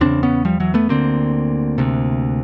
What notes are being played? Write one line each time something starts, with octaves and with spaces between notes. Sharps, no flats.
E2 C#3 C4 D4
B3 C#4
F3 G3
E3 F#3
A3 B3
D2 D3 A#3 C4
D2 C3